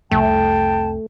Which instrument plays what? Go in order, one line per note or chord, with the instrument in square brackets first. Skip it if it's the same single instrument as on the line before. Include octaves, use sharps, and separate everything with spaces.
[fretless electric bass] F1 C2 C3 [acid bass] A3 [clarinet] G5 [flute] A5